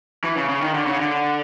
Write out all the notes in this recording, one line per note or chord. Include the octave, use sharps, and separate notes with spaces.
E3
C#3
C#3
D#3
D3
C#3
D3